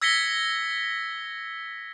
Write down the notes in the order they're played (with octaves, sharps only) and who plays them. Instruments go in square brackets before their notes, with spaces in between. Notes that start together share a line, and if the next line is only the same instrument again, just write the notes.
[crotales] E6 G#6 A#6 B6 C#7 G7